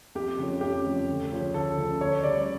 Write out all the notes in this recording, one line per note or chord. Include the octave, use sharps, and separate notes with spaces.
F2 G4
C#3 F3 A3 C#4
F2 G4
C#3 F3 A3 C#4
D2
C#3 F3 C#4
D2 A4
C#3 F3 C#4
D2 C#5
C#3 G3 C#4 D5